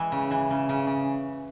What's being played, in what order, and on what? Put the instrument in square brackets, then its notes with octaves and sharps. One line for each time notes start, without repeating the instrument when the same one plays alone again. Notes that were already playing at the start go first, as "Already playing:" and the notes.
Already playing: [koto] E3 G#3 E5
C#3
E3
C#3
C#3
C#3